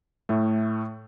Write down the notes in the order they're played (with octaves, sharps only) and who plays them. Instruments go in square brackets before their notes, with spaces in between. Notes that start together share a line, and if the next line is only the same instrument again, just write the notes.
[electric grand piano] A2 A3